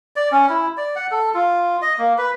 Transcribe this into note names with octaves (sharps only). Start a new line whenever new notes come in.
D5
C#4
E4
D5
F#5
A4
F4
D#5
A#3
B4